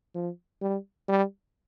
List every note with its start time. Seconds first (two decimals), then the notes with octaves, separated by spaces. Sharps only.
0.15 F3
0.62 G3
1.09 G3